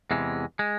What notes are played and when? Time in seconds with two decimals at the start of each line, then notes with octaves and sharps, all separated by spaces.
0.11 E2 C3 E3 G#3
0.59 G#3